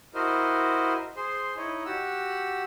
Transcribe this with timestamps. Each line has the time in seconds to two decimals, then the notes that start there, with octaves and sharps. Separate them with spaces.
0.14 E4 F#4 A#4 C5 D#5
1.16 G#4 C5 C6
1.57 D#4 E4 C#5 D#5
1.85 F#4 G4 F#5 E6